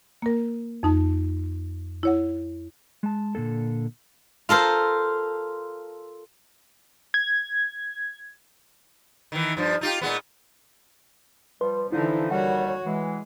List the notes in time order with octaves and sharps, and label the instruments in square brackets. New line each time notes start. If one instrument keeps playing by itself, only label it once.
[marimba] A#3 A#4
F2 D#4 A5
E4 C#5 F#5
[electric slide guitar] G#3 A5
A#2 D3 A#3 A4
[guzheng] F4 A4 A#4 C5
[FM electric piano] G#6
[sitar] D#3 E3
G2 F3
D#4 F4 G4
A#2 G#3 B3
[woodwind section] F3 G3 [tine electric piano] B4 C6
[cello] D3 E3 [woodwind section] F3 D#4 [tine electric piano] E4
[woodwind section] D#2 G3 [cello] F#4 C#5 [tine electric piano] F#5
[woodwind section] E3 [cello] G#3